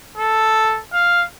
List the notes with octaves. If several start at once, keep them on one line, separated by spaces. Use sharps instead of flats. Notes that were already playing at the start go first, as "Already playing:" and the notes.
A4
F5